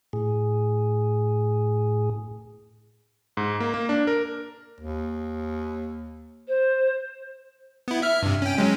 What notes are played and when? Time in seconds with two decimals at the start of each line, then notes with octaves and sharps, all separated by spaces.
0.13 A2 G#4
3.37 G#2
3.60 A#3
3.74 A#3
3.89 D4
4.07 A#4
4.81 D#2
6.48 C5
7.88 B3 E4
8.02 E5 F6
8.23 G2 C3
8.42 C#4 G5
8.57 F#3 G#3 C#4